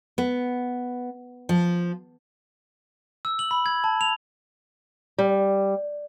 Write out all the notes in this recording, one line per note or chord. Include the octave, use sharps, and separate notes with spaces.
B3
F3
E6
F#7
B5
G#6
A5
F7
G3